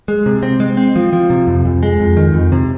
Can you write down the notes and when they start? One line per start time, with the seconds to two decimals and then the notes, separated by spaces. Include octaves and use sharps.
0.08 G#3
0.26 C3
0.43 C4
0.60 G#3
0.77 C4
0.96 F3
1.13 F3
1.30 C3
1.47 F2
1.65 F2
1.83 G#3
2.00 F2
2.17 D#3
2.34 F2
2.52 C3